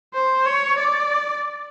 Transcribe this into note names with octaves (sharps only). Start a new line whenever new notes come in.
C5
C#5
D5